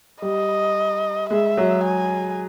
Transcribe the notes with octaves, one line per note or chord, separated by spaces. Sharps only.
G3 D#5
G#3 E5
F#3
G#5